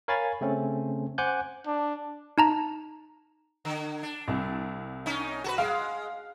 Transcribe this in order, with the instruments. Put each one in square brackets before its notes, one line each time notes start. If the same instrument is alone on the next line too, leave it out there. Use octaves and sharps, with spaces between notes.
[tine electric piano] A#4 C#5 F5 G#5 B5 A6
C#3 A3 C4 C#4
C5 F#5 G#5 D6 F#6 G6
[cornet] D4
[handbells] D#4 A5 A#5
[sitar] D3
D4
[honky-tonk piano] C2
[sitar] C#4 D#4
F#4 A4 B4
[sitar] G#3 [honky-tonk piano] F5